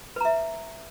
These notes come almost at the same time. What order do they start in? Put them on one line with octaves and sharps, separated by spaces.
B4 A#5 E5